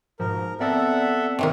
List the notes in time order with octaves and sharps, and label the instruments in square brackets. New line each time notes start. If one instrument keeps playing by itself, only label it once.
[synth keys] G#2 B2 F3 [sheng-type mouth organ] A#4
[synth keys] B3 C4 D5 [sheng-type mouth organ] A4 E5 F#5
[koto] C3 D#3 A#3